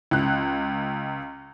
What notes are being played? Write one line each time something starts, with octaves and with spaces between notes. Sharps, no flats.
C#2 F#6